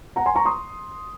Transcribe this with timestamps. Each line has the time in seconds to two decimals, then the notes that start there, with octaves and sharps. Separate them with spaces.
0.16 F#5 A#5
0.26 G#5 C6
0.35 A#5 C#6
0.45 C6 D#6